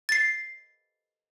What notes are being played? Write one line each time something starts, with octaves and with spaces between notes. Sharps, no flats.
A6 C7